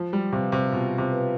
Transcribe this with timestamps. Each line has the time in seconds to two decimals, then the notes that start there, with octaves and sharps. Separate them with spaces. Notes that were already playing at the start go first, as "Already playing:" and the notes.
Already playing: F3 F4
0.13 G3
0.32 C3 B4 F5
0.52 C3
0.72 B2 F4
0.98 C3
1.11 B4 F5